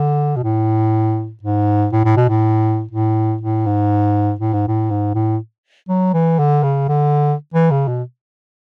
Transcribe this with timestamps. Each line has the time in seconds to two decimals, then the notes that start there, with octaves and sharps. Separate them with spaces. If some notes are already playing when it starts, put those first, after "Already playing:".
Already playing: D3
0.36 B2
0.43 A2
1.43 G#2
1.92 A2
2.05 A2
2.16 B2
2.29 A2
2.91 A2
3.41 A2
3.66 G#2
4.40 A2
4.53 G#2
4.68 A2
4.90 G#2
5.14 A2
5.88 F#3
6.13 E3
6.39 D3
6.63 C#3
6.89 D3
7.54 E3
7.71 C#3
7.88 B2